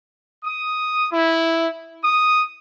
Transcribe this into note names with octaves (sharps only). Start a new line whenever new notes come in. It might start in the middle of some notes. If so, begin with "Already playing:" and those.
D#6
E4
D#6